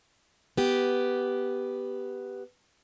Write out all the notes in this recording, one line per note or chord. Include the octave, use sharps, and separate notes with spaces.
B3 G4